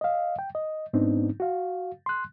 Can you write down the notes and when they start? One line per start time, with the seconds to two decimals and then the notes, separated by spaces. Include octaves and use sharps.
0.01 D#5 F5
0.39 G5
0.55 D#5
0.93 G#2 B3 C4 D4 D#4
1.40 F#4 F5
2.06 C6 F#6